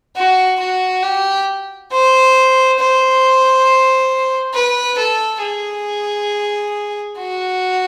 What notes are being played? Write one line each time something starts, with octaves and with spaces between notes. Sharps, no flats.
F#4
F#4
G4
C5
C5
B4
A4
G#4
F#4